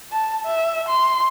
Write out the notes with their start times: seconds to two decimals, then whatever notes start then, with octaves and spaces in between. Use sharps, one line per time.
0.12 A5
0.46 E5
0.89 C6